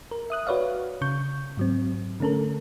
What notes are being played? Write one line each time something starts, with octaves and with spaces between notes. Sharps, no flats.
A#4
E5 D#6 F#6
F#4 B4 C#5 D5 F5
C#3 C#6 G6
G#2 F#3 C4
D3 A3 C#4 A4 A#4